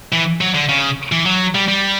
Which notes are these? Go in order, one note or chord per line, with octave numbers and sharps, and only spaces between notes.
E3
F#3
D3
C#3
E3
F#3
G3
G3